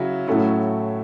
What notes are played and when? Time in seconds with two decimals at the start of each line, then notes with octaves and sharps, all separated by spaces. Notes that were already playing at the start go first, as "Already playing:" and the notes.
Already playing: C#3 F#3 C#4 E4
0.27 A2 F#3 A3 C#4 E4